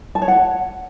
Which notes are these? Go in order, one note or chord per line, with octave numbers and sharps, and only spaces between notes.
A5
C#5
F#5